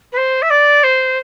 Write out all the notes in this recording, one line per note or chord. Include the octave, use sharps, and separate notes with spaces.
B4
C5
E5
D5
C5